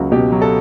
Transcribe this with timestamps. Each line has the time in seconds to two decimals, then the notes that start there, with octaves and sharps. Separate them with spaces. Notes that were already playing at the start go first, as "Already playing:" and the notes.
Already playing: C#2 F#3 A#3 F#4
0.12 B2 G4
0.32 F#3
0.42 A4